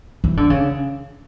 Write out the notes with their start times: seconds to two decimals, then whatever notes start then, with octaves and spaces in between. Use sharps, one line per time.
0.24 E3
0.37 D3
0.50 C#3